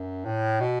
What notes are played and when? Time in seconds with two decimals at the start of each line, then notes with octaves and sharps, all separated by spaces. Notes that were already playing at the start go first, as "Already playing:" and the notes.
Already playing: F#2
0.25 A2
0.61 B2